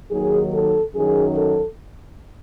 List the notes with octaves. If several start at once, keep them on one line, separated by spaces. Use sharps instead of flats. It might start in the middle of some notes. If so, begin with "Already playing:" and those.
D#2 D#3 F#3 G#4
A4
F#2 D#3 F#3 G#4
A4